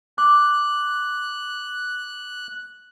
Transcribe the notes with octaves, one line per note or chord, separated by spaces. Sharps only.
D6 F#6